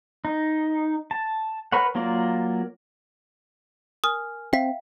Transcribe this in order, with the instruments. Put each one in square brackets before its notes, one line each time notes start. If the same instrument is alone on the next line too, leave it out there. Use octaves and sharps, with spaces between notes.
[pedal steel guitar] D#4
A5
A#4 B4 C#5 F#5
F#3 A#3 F4 A#4 D5
[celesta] A#4 G#5 F6 [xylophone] D#6
[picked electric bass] C4 [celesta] E5 F5 [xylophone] G5 B6